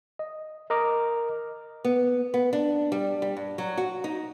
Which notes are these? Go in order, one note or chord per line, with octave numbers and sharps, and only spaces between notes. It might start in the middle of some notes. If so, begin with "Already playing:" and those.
D#5
A#4 D#5 A#5 D6 F6
B3
B3
D4
G3
G3
G2
F#3
F#4
D#4